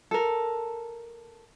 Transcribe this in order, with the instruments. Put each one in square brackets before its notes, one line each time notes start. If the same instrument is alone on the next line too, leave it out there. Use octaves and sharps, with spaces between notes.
[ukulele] A4 A#4